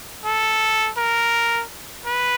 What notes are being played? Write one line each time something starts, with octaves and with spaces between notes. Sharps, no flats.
A4
A#4
B4